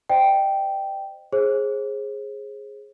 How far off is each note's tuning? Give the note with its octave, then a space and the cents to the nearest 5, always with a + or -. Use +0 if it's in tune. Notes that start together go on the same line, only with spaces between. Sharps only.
C5 +0 D#5 -35 G5 -5
G#4 +0 C5 +40